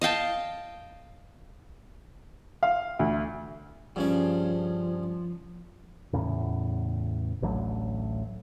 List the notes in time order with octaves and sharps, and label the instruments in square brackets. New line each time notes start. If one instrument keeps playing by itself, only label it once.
[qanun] D#5 F5 G5 A5
[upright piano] F5
D2
[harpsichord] G2 C#3 C#4 [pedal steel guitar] F3
[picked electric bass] E2 A2 C#3
A1 D2 F#3